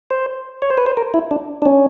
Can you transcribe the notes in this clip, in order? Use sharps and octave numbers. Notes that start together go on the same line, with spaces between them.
C5
C#5
C5
B4
C5
A#4
E4
D4
D4
C#4